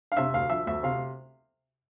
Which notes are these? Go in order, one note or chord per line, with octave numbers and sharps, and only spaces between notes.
F5
C3 E5
D2 F5
F3 E5
D2 E5
C3 F5